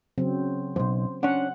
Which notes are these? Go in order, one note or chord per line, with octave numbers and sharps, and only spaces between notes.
C#3 F#3 C4
B1 E2 C5
C#4 D4 F#5